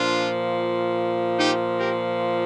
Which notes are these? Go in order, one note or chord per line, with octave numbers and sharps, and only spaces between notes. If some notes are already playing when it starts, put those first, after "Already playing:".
Already playing: A#2 F3 D4 F4
D#4 G4
G4 A#4